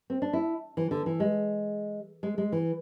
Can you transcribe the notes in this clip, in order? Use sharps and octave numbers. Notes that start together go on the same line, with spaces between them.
C4
D4
E4
E3
D3
E3
G#3
G#3
G#3
E3